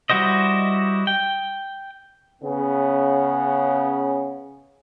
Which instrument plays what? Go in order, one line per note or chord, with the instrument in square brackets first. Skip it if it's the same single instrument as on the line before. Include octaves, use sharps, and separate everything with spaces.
[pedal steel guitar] G3 E4 F#4 C5 D#5
G5
[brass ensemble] C#3 B3